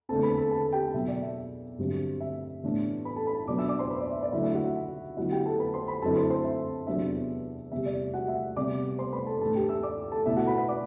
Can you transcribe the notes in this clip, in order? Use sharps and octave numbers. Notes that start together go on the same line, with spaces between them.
E2 D3 A3 C4 A4 A5
B4 B5
A4 A5
A4 A5
G4 G5
B2 F#3 B3 E5
D5
E5
G2 D3 F#3 C4
E5
A2 E3 B3 D4
B4 B5
A4 A5
B4 B5
B2 F#3 B3 D4 D5 D6
E5 E6
D5 D6
C5 C6
B4 B5
D5
E5
D5
D3 F#3 A3 E4 E5
E5
F#4 F#5
E5
D3 F#3 B3 E4 F#4 F#5
G4 G5
A4 A5
B4 B5
C5 C6
B4 B5
F#2 D3 F#3 C4 E4 A4 A5
C5 C6
C5 C6
E5
E2 C3 F#3 B3 D4 E5
E2 C3 G3 E5
D5
F#4 F#5
E5
C3 G3 B3 D5 D6
C5 C6
B4 B5
A4 A5
A2 E3 A3 D4 A4 A5
G4 G5
E5 E6
D5 D6
A4 A5
B2 A3 E4 E5
F#4 F#5
B4 B5
B4 B5
D5 D6